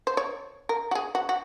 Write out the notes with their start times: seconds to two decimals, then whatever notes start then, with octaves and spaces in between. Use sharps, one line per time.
0.07 C5
0.17 C#5
0.69 A#4
0.91 F#4
0.95 G#4
1.15 F#4
1.29 F#4